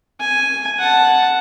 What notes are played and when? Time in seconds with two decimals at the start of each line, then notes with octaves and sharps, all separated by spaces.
0.20 G#5
0.79 F#5 A5